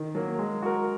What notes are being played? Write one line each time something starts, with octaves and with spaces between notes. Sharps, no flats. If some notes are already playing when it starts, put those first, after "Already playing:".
Already playing: D#3
F#3 A#3
G#3
F#4 A#4